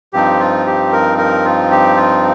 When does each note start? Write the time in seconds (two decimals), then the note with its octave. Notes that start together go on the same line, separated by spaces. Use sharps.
0.13 G2 F3 C4 D#4 G4
0.40 F4
0.67 G4
0.93 A#4
1.18 A#4
1.45 F4
1.71 G4
1.97 F4